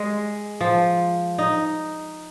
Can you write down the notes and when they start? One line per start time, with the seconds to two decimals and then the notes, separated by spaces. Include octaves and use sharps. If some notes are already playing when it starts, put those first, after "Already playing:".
Already playing: G#3
0.61 F3
1.38 D#4